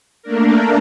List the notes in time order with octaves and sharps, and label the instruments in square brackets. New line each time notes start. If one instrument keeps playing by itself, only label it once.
[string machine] A3 A#3 D4 A#4